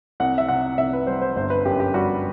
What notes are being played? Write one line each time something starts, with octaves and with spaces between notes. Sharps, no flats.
C2 F#5
E5
C3 F#5
C2 E5
B4
G3 C5
C5
G1 C5
B4
F#2 G4
G4
G3 F#4